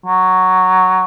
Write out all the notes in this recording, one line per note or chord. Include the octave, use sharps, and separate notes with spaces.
F#3